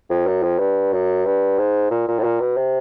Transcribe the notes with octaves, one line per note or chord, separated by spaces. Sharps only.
F2
F#2
F2
G2
F#2
G2
G#2
A#2
A#2
A2
A#2
B2
C3